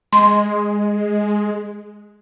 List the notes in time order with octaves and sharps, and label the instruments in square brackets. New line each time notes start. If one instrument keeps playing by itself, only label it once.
[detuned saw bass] G#3 [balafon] C6